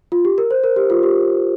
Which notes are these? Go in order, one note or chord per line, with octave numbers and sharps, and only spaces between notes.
F4
G4
A#4
C5
A#4
G4
F4
G4